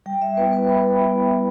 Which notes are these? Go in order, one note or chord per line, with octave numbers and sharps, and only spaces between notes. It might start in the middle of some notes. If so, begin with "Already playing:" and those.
G3 G5
E5
B3 E4 B4
B4
G3 B5
B3 E4
G3